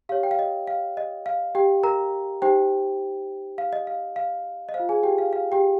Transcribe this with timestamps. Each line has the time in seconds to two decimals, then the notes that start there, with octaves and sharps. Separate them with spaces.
0.09 G4 C#5 F5
0.23 G5
0.31 F5
0.39 D#5
0.67 F5
0.97 D#5
1.26 F5
1.55 G4 G5
1.83 A#4 A#5
2.42 D#4 G4 C5 G5
3.58 F5
3.73 D#5
3.87 F5
4.16 F5
4.69 D#5
4.74 C5 F5
4.80 F4
4.89 G#4 G#5
5.03 G4 G5
5.18 F5
5.33 F5
5.52 G4 G5